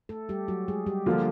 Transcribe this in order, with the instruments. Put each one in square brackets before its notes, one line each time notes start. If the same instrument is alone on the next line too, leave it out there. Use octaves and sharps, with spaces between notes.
[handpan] A3 A4
G3 G4
F#3 F#4
G#3 G#4
G3 G4
[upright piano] D3 F3 A#3 D4 F4 [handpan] G3 G4